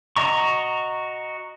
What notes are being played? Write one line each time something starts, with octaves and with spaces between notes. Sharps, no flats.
F#4 D#5 A#5 C#6